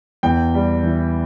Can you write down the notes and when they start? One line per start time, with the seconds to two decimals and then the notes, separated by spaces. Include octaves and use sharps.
0.23 E2 G5
0.54 G3
0.84 E3